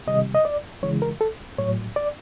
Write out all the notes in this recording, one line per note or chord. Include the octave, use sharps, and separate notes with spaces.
C3 D#3 G3 D#5
D#5
D5
C#3 E3 G#3 C#5
A#4
A4
A2 F#3 C#5
D5